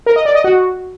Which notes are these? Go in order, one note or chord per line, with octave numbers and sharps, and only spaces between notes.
A#4
D#5
D5
D#5
F#4